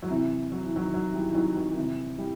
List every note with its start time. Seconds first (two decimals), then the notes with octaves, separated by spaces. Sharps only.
0.03 F#3
0.10 C3 E3
0.52 F#3
0.64 E3
0.76 D#3 F#3
0.93 D#3 F#3
1.14 E3 G3
1.31 E3
1.34 D#3 F#3
1.56 D#3 F#3
1.72 D#3
1.76 C3 E3
2.18 E3 G3